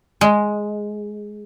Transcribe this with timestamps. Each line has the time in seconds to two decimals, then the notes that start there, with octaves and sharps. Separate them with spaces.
0.21 G#3